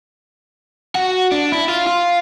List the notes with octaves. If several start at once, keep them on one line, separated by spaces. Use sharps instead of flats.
F#4
D4
E4
F4
F4